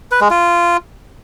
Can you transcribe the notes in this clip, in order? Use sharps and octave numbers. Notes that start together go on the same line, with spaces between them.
B4
G#3
F4